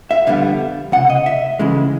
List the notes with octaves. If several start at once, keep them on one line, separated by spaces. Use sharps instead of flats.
E5
F2 D3 G3 B3 F5
C#2 C3 F#5
D#5
E5
F2 C#3 E3 G#3